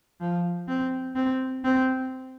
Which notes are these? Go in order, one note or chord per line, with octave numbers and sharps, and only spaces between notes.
F3
C4
C4
C4